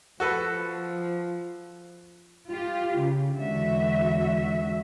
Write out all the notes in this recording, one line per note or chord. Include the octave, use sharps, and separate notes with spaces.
F3 F#4 A4 B4
F4 G4
C#3
E2 D3 G#3 F#4 E5